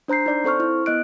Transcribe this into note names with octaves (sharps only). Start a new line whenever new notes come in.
D4 C5 A#5 G6 C7
D#4 D5 G6
C4 A4 C5 C#6 F6
E4 F6
B3 D#5 F#6 D7